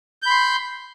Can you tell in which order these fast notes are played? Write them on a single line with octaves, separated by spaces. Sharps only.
G6 B5 C6